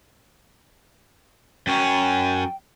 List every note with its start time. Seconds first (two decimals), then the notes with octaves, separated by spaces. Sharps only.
1.67 F#2 C#4 G5